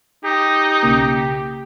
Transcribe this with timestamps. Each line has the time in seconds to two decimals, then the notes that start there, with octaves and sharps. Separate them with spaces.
0.25 D#4 G4
0.83 B1 C#3 A#3